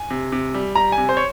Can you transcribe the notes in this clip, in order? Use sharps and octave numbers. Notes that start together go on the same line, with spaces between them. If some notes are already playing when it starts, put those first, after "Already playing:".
Already playing: G#5
C3
C3
G3
G3 A#5
G#5
C3
C5
C#5